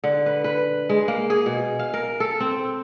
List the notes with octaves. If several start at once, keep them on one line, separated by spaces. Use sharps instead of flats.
D3
B4
B4
G#3
A#3
G#4
B2
F5
A#4
A4
C4